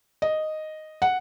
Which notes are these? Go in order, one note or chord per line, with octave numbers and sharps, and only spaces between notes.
D#5
F#5